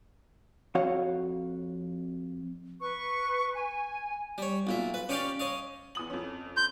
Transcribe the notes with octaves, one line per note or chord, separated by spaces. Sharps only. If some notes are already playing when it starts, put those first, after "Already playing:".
F2 F#4 C#5 F5 F#5
B4 C#6
G#5
G3 C#5
B1 A#2 E5
B4
C#4 G4 C#5 D5 F5 G5
C#5 D#5 F5
E2 D#6 F#7
F2 C#4
C6 G6